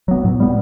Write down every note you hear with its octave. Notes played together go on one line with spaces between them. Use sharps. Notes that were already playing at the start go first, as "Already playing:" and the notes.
F#3 B3
A2
G3 B3